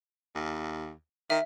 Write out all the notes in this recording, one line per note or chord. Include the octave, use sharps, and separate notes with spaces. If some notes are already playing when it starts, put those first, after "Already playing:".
D#2
D#3 E5